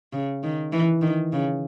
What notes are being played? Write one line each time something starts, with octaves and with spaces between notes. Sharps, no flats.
C#3
D#3
E3
D#3
C#3